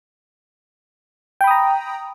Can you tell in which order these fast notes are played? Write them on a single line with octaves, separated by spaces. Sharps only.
G5 B5 D#6 A#5